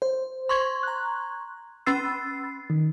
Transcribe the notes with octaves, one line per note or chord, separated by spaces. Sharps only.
C5
C6 C#6 G#6
A#5 F#6
C#4 B5 E6 A6 C7
D#3